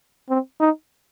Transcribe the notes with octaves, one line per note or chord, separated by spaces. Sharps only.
C4
D#4